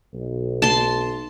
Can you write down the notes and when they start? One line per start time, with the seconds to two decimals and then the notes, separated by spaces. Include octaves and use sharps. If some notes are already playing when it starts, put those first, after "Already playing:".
0.13 B1
0.62 A5 C6